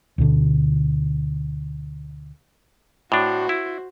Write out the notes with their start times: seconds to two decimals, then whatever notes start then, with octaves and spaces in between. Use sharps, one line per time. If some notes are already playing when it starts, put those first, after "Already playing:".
0.18 D2 B2 D3
3.12 A2 D4 F#4 C5
3.49 E4